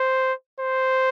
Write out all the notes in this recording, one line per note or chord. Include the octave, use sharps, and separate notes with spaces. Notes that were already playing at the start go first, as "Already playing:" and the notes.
Already playing: C5
C5